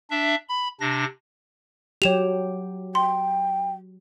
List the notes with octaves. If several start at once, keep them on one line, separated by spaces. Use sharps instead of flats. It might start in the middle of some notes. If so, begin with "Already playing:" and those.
D4 E5
B5
C3 D4 A#6
F#3 G4 C#5 E7 F7
G5 C6